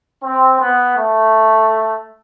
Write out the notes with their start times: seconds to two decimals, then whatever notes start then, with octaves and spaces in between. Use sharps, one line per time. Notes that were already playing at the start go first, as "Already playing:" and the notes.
0.24 C4
0.60 B3
0.97 A3